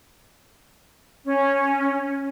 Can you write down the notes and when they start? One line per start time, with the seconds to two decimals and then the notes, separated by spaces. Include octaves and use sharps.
1.24 C#4